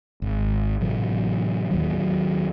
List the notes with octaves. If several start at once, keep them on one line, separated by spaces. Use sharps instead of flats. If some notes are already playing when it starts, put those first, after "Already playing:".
G#1
A2 C3 E3 F#3
D#2 D#3 F#3